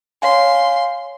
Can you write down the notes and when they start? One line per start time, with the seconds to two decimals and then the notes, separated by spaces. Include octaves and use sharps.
0.22 C#5 F5 G#5 C6